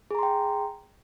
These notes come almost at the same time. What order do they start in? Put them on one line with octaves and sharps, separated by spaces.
G#4 A#5 C6 G5